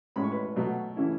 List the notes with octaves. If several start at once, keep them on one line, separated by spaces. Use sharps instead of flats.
A2 G#3 C#4 B5
C#6
B4 B5
B2 F#3 A3
C#3 E3 A3 C#4 E4